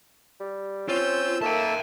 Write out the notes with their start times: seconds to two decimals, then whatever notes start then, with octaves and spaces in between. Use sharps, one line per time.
0.40 G3
0.88 C4 C#4 F4 E6 G6
1.42 D#3 A#3 A4 E5 G5 A5